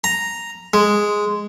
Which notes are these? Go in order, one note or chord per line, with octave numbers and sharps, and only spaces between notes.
A#5
G#3